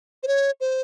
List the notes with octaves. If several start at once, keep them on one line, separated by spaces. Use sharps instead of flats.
C5
C#5
C5